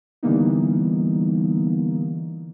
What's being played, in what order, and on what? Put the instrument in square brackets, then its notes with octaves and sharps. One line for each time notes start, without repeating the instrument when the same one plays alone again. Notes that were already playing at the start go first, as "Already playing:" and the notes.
[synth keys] D3 E3 G3 A#3 B3 D#4